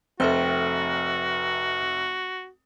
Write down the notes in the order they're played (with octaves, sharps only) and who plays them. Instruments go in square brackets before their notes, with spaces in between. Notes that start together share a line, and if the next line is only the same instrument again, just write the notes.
[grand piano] F1 [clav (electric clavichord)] C4 [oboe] F#4 [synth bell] A4 E5 G5